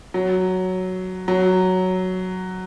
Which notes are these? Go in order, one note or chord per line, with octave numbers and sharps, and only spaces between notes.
F#3
F#3